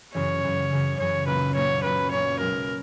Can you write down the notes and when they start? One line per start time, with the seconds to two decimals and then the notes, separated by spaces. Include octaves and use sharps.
0.14 F#2 C#3 E3 C#5
0.43 F#2 C#3 E3
0.71 F#2 C#3 E3
0.98 F#2 C#3 E3 C#5
1.26 B1 A#2 A#3 C#4 B4
1.55 B1 A#2 A#3 C#4 C#5
1.83 B1 A#2 A#3 C#4 B4
2.11 B1 A#2 A#3 C#4 C#5
2.40 B1 B2 G#3 A#4